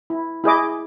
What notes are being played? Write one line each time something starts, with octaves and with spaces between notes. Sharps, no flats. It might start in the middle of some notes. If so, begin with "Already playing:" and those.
E4
E4 G#4 D#5 D6